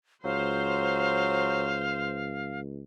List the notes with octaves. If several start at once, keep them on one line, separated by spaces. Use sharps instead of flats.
C#2 F#3 C5 F5